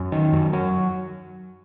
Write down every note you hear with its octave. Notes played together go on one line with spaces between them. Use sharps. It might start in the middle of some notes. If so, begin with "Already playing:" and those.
Already playing: F#2
D#3
F#2
F#3